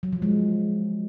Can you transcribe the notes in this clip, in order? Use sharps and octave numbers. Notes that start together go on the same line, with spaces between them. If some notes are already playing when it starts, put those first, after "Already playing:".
F#3
F3
G#3